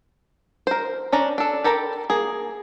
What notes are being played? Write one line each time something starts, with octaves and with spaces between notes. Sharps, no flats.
A#4 C5
C#4 D4 A#5
D4 A4
G4 A4 A#4 A#5 B5
A#3 G#4